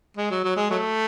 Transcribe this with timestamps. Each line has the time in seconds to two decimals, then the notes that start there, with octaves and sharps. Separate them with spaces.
0.17 G#3
0.30 F#3
0.44 F#3
0.56 G#3
0.70 F#3 A3